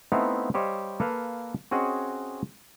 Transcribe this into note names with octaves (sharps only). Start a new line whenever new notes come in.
A3 B3 C4 D#4 E4 F5
G3 G4 C5 C#5 D#5 F5
A#3 A4 B4 F5
C4 C#4 F#4 G#4 D#5 F#5